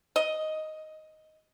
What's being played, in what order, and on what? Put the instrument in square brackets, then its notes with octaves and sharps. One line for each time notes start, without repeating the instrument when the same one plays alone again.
[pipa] D#5